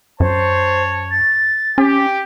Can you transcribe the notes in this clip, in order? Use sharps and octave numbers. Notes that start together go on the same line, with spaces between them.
F#2 C5 C#5 A5
A6
C#4 G4